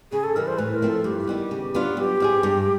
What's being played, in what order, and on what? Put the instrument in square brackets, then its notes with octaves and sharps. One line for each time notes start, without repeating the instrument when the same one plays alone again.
[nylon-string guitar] C#3 [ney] G#4
[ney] A4
[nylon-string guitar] E3 G3 [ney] A#4
[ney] C5
[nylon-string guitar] A2 [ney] B4
[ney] A#4
[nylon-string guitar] F3 A3 C4
[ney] A4
[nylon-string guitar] G2 [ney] G4
[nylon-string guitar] D#3 G3 B3
C#3
F#3 B3 D4 F4
[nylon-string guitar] G3 [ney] G4
[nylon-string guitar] C4 F4 G#4
G2